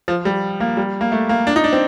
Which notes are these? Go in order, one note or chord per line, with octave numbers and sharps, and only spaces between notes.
F3
G3
A#3
G3
A#3
A3
A#3
D4
D#4
D4
C4